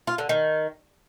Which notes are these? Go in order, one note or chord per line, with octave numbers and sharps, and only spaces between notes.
F4
D3
D#3